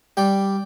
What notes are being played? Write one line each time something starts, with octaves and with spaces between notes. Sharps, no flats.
G3 D5 G5